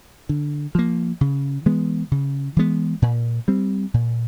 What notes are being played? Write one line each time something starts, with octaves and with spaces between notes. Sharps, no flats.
D3
F3 A#3
C#3
E3 G#3 B3
C#3
E3 G#3 B3
A#2
G3 C4
A#2